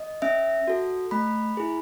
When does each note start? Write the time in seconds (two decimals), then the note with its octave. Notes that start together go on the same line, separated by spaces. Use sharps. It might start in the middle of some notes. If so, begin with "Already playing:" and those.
Already playing: D#5
0.22 C#4 E5
0.68 F#4 A4
1.11 A3 B5
1.57 E4 G#4